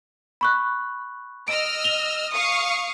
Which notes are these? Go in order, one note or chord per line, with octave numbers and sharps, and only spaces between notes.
B5 C#6 F#6
D#5 E6 F6 D7
F7 G7
F5 C#6 D#6